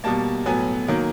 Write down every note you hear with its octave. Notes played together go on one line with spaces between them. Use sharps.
B2 G3 A#3 A5
A2 F#3 B3 G#5
D#3 F#3 A#3